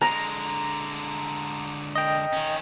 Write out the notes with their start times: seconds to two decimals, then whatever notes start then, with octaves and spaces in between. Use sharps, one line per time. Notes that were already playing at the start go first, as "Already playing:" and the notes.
0.02 D3 G#3 A#5
1.95 D#5 G5
2.33 D#3 C#4